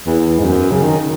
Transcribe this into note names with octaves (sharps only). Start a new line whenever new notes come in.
E2
G#2
F#2
C#3
D#3